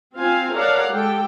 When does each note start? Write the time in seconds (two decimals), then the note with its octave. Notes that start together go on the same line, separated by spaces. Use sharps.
0.16 C4 F4 F5 G#5
0.54 A4 A#4 C#5 D5 F5 F#5
0.90 G#3 G4 A4 G5